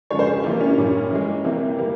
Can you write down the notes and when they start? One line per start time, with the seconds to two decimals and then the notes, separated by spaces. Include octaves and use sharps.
0.10 C#3 F3 G#3 C#5
0.19 C5
0.27 G#4
0.36 G4
0.44 C3 E3 A#3 F4
0.61 C#4
0.78 A#2 G3 A#3 C#4
1.11 E3 G#3
1.44 C3 E3 A#3 C4
1.79 C3 G3 A#3